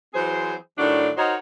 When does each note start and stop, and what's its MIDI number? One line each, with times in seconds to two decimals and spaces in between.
0.14 0.54 52
0.14 0.54 54
0.14 0.54 60
0.14 0.54 68
0.14 0.54 72
0.78 1.10 45
0.78 1.10 51
0.78 1.10 54
0.78 1.10 62
1.17 1.34 63
1.17 1.34 66
1.17 1.34 70
1.17 1.34 72
1.17 1.34 73
1.17 1.34 75